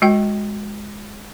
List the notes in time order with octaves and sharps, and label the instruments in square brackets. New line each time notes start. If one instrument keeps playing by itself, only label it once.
[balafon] G#3 F#4 G5